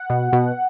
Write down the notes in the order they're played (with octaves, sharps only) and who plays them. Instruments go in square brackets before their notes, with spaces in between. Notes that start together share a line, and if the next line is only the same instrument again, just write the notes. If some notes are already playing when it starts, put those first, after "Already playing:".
Already playing: [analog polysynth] F#5
B2
B2